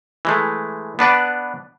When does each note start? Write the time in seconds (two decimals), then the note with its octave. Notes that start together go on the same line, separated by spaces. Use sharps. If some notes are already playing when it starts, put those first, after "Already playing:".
0.25 E3 G#3 A3
0.99 B3 D4 B4 D5